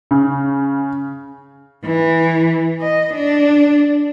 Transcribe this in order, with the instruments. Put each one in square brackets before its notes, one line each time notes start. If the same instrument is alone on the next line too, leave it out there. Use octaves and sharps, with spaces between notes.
[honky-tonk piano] C#3
[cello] E3
D#5
D4